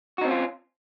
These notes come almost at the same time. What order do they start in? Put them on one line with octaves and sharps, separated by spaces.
F#4 D#4 C4 C#4 F4